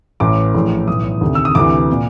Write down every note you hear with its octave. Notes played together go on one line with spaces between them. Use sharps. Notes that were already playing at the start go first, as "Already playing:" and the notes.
A1 A2 E3 D6
A#1 A2 E3
B1 A2 E3 D#6
D2 C3 D#3
E6
D#6
D2 C3 E3 D6
A#2